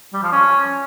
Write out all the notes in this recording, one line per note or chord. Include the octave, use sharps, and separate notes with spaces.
G3
F3
C#4